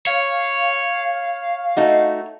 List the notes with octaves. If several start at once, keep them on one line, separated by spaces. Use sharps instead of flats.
C#5 F5
A3 D#4 F#4